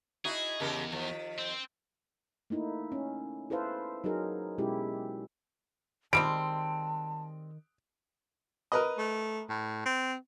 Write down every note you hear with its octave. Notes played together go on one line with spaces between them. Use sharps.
D#4 E4 F#4 G#4
E2 C#3 G4 A#4
D#3 F3
C4
A3 A#3 D#4 E4
C#4
E4 A4 B4 C5 F5
F#3 D#4 G#4 A#4
B2 G#3 C#4 E4 G4
D#3 G3 G#3 C4 A5 D7
A#4 B4 D#5
A3
A2
C4